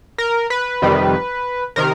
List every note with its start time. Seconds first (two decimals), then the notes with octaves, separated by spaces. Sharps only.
0.18 A#4
0.50 B4
0.82 F2 C3 D#3 G3
1.76 C3 D#3 A#4